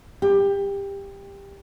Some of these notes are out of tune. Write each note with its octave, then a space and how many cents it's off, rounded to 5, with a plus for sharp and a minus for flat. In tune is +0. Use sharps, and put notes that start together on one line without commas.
G4 +20